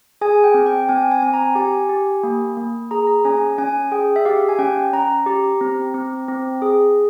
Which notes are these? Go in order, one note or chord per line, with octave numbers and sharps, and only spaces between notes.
G#4 G#5
G5
C4
G5
C4 G#5
G#5
C4 G#5
A#5
G4 G#5
G4
A#3
A#3
G#4 A#5
A#5
C#4 G#5
C#4 G#5
G#4 G5
E5
G4 F5
G#5
C#4 G5
C#4 A#5
G4
C4
C4
C4
G#4